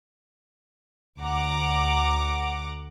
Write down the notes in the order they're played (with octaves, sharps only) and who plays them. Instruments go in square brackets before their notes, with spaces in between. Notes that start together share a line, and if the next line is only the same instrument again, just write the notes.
[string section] D2 F#5 A#5 D6